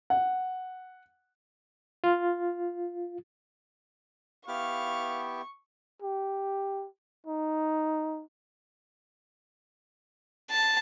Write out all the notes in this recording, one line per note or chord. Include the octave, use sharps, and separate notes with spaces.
F#5
F4
B3 E4 G4 F5 C#6
G4
D#4
A5